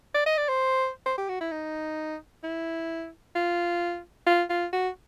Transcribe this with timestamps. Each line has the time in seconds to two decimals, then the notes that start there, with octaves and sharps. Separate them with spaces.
0.14 D5
0.26 D#5
0.37 D5
0.49 C5
1.06 C5
1.18 G4
1.29 F#4
1.41 E4
1.51 D#4
2.44 E4
3.35 F4
4.27 F4
4.50 F4
4.73 F#4